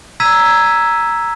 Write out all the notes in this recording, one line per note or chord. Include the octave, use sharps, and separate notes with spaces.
A#5 E6 G#6 B6 D#7 E7